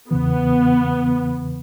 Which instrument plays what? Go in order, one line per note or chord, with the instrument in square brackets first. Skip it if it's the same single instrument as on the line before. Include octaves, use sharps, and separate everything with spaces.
[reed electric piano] E2 C#3 E3 [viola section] B3